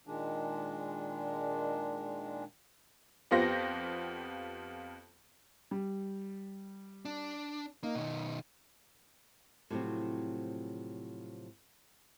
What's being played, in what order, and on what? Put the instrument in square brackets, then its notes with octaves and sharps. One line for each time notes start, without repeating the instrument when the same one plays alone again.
[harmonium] A#2 D#3 G#3 D4
[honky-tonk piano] F2 B3 F4 G4 C5 A#6
[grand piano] G3
[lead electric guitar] D4
[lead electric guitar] A#3 [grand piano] D#4
[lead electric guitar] B2 D#3
[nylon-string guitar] A2 C3 F3 F#3 C4